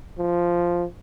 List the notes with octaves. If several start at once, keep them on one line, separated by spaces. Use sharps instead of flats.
F3